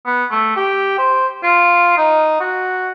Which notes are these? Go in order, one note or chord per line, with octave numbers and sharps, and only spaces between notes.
B3
A3
G4
C5
F4
D#4
F#4